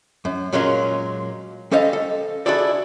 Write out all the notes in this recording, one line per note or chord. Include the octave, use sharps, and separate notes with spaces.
F#2
A#2 F#3 G#3 C#4 F4 A#4
G3 C#4 A4 C5 D#5 F5
A4
D4 E4 F#4 G#4 A4 D5